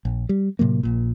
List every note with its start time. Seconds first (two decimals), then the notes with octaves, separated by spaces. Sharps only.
0.05 A#1
0.29 G3
0.59 A2 C3 F#3 A#3
0.83 A#1 A#2